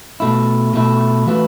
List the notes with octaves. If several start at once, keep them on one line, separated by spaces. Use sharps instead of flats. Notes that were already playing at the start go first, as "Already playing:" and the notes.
B2 A3 E4
B2 A3 E4
E3 A3 F#4 B4 E5